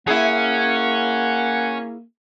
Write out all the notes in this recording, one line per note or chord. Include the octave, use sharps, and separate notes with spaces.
A#3 C#4 E4 G#4 F#5